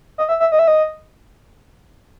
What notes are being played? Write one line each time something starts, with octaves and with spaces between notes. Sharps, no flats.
D#5
E5
E5
D#5
E5
D#5